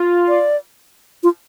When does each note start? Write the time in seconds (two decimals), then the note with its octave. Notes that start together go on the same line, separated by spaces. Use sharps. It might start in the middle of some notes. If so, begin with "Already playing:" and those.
Already playing: F4
0.28 D5
1.23 F4